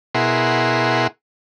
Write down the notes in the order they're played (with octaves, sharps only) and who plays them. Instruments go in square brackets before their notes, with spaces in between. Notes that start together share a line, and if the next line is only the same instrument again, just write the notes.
[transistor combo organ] B2 E4 G#4 A#4 F#5 C6